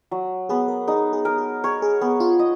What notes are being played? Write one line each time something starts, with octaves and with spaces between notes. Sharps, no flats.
F#3
B3 G#4
A#4
D#4 G#4
G#4
A#4
G#4
G#4 C#5
G#4
B3 G#4
F4
D#5